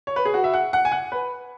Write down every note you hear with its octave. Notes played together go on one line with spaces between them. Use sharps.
C#5
B4
G#4
F#4
E5
F#5
F#5
G#5
F#5
B4